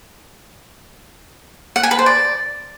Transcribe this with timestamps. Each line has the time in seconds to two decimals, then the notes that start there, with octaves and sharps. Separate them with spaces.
1.76 F#5
1.83 G#5
1.91 B4
1.99 C5
2.06 D5